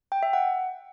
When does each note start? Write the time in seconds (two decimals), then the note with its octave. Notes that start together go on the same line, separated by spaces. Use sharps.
0.12 G5
0.23 E5
0.33 F#5